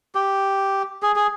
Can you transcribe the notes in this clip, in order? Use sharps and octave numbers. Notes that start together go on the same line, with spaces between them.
G4
G#4
G#4